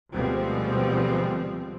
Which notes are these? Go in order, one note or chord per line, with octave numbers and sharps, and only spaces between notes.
D2 B2 F3 G3 G#3 C4